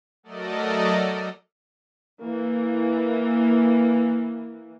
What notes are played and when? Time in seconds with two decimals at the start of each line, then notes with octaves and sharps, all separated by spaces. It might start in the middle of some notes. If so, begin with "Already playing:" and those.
0.23 F#3 A3 A4 A#4 D5 D#5
2.19 E3 A#3